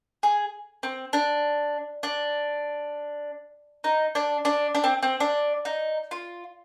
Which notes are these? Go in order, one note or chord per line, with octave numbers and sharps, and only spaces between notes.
G#4
C4
D4
D4
D#4
D4
D4
D4
C4
C4
D4
D#4
F4